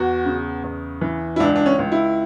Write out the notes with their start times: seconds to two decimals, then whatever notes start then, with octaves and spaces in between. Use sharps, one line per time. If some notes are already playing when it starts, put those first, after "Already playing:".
Already playing: E2 F#4
0.25 C#3
0.63 E2
1.01 E3
1.36 E4
1.40 C#2 D4
1.56 D4
1.66 C#4
1.79 C#2
1.92 E4